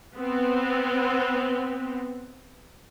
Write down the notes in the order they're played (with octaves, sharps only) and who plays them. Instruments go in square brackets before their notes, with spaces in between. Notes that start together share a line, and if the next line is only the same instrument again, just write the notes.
[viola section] B3 C4